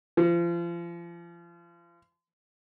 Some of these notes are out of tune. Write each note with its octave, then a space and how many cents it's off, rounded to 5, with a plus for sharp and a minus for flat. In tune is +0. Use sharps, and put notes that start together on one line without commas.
F3 -35